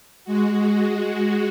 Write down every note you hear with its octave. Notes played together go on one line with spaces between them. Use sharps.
G#3 F#4